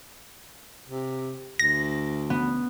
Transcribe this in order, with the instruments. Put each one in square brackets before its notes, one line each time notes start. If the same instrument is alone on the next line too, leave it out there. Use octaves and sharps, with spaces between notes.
[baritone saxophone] C3
[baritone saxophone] D2 [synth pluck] A#6
[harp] B3